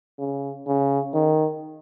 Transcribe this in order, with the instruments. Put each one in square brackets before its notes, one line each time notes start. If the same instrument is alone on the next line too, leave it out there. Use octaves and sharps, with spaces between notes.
[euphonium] C#3
C#3
D#3